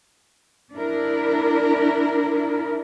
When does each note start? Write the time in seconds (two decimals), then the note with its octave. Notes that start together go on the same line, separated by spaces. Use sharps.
0.73 D4 E4 A#4